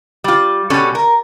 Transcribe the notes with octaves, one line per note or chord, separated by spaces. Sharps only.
G3 F4
B2 G3 C#4 A4
A#4